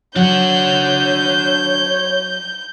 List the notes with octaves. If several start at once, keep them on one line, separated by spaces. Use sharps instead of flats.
F#3 D4 C#5 F#5 G6